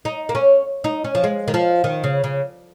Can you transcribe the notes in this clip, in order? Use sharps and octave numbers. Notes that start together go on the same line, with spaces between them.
D#4
A#3
C#4
D#4
C#4
F3
G#3
D#3
F3
D#3
C#3
C#3